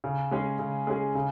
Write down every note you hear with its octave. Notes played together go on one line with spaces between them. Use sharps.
C#3
G#3 C#4 G#4
C#3
G#3 C#4 G#4
C#3